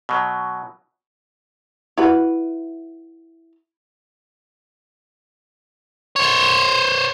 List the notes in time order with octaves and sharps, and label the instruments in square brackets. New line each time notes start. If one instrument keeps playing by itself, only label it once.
[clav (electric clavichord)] B2 F#3
[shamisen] E4 F#4 B4
[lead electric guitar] C5 C#5